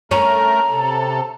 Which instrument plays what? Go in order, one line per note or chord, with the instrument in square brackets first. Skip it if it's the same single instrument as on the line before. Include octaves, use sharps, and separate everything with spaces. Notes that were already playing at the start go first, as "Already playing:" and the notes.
[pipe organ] A3 A#4 [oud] C#4 [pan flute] A#5
[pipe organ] C3 A4